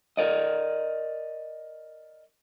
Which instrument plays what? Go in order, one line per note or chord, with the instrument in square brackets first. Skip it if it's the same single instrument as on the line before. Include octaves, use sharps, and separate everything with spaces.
[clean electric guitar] A#4 D5 D#5